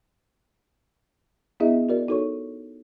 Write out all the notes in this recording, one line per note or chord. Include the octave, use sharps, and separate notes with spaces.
B3 D4 E4 G#4 D#5 E5
F#4 A#4 D5
D#4 F#4 A4 C#5 C#6